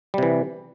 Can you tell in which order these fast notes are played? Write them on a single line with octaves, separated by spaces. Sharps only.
G3 C3 E3